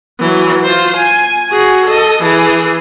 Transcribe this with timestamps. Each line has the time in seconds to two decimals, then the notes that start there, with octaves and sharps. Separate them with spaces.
0.20 E3 F#3
0.64 F4 C5
0.97 G#5
1.51 F#4 G#4
1.86 A4 D#5
2.23 E3 G#4